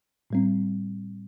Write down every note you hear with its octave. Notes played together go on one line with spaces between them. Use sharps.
A2 G3 C4